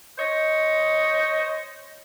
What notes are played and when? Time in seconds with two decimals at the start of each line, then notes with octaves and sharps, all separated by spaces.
0.19 C5 C#5 D#5